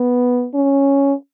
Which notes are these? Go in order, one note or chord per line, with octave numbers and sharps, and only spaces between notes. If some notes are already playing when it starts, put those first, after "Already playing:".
Already playing: B3
C#4